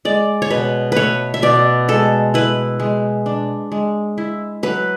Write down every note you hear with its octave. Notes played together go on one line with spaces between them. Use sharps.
G#3 D5
C#5
B2 B4
A3 B4 C#5
E5
B2 D5
G#3 A4
E4 B4
G#3
D4
G#3
E4
F#3 B4